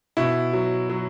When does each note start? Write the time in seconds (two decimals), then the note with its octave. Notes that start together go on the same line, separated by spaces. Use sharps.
0.17 B2 E4
0.53 F#3
0.90 F#3